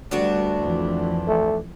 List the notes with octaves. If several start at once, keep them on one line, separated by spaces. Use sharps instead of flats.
D2 G3 B3 D4 F#4
F2 E3
A3